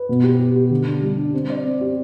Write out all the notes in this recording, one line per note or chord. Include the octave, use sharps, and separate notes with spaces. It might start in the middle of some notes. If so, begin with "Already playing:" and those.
Already playing: B4
B2
G4
G4
G4
D3
D4
G3
D4
C4
D5
C4
G4